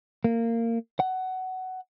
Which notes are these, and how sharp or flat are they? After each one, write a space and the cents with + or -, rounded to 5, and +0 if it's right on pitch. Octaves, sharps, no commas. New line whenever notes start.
A#3 -20
F#5 +15